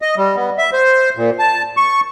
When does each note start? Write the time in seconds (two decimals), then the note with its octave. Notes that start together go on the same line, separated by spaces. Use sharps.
0.02 D#5
0.17 G3
0.36 B3
0.58 E5
0.73 C5
1.17 A#2
1.39 A5
1.77 C#6